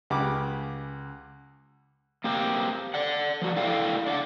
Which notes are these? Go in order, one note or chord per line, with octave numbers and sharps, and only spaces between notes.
C#2 C#3 G4 F#5 D6
A#3 C4 G4
D5 F#5
F3 G3 F#4
E4 A4 D5 F5 G5
D4 D5 F5 F#5